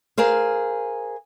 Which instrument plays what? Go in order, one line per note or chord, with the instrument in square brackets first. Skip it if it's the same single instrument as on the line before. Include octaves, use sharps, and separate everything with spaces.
[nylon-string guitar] G#4 A#4 C5 F5